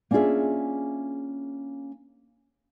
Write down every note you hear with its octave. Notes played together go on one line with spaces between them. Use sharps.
A#3 C#4 D4 F4 G#4 E5